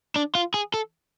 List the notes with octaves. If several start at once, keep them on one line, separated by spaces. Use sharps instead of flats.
D4
F4
G#4
A4